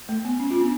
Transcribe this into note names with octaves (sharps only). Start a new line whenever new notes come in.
A3
B3
C#4
C#4 F4
B3 D4